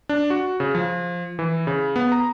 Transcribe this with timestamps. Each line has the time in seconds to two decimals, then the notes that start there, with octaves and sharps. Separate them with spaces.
0.09 D4
0.30 F#4
0.60 C#3
0.75 F3
1.39 E3
1.67 C#3
1.96 B3
2.12 A#5